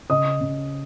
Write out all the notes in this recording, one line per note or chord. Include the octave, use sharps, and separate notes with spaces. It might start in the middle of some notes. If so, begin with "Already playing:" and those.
C#3 D#5 D#6
C#3